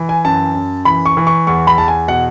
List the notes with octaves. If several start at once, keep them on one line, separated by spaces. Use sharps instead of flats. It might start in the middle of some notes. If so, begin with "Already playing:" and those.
Already playing: E3
G#5
F#2 A5
F#2
E3 B5
C#6
E3
C#6
E2 C#6
B5
E2 A5
G#5
B2 F#5